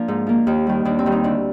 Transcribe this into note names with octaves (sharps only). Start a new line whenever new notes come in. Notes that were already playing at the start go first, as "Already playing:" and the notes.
Already playing: F3 A#3 D4
G#2
F3 A#3
D#2 D#4
D#3 G3
D#2 D4
C4
D#3 G3
D#4
D2 D4